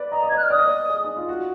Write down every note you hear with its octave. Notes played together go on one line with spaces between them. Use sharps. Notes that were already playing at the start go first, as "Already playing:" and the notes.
Already playing: B4 D5
D#5 A#5
D#5
G#6
D5
F#6
F6
D5 D#6
D#5
D5
G#4
D#4
F4
F#4